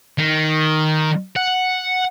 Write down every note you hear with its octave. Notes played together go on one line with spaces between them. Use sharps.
D#3
F#5